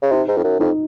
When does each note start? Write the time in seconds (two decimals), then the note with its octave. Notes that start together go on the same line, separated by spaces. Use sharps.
0.02 C#3
0.11 C3 D#4
0.28 G#2
0.37 F2
0.44 F#2
0.60 F2 D#4